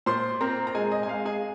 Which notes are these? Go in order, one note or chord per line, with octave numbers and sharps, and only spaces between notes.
A#2 C5 C6
C4 A#4 A#5
A#5
G#3 G#4 G#5
D#5
G#5
G#3 F5
G#4 G#5